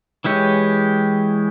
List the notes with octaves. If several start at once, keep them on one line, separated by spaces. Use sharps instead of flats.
E3 G#3 E4 G4 C#5